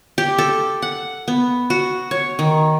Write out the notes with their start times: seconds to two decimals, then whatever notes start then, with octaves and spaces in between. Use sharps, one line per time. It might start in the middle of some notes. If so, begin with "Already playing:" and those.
0.18 G4
0.38 A4
0.82 F#5
1.28 B3
1.70 F#4
2.11 C#5
2.39 D#3